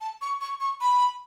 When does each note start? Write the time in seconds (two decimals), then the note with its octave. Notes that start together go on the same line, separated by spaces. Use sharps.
0.01 A5
0.21 C#6
0.41 C#6
0.60 C#6
0.81 B5